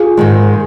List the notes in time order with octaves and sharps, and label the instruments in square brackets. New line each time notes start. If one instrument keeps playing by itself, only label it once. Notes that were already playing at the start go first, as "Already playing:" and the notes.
Already playing: [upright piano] F4 G#4
[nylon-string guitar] G#2 D#3 G#3